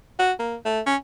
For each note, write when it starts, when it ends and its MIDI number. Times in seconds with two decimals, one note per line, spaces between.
0.19 0.33 66
0.39 0.56 58
0.65 0.81 57
0.86 0.96 61